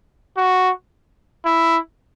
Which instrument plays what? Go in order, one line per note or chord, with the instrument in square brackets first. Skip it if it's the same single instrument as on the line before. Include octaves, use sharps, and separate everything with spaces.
[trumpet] F#4
E4